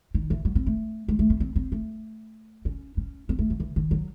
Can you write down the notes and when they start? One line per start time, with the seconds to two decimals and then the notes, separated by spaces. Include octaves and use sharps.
0.14 D#3
0.30 E3
0.45 F#3
0.55 C4
0.66 A3
1.08 G#3
1.19 A3
1.30 C4
1.40 C4
1.56 C4
1.72 A3
2.65 C#4
2.97 C#4
3.29 C4
3.39 A3
3.50 F#3
3.60 E3
3.76 D#3
3.91 F#3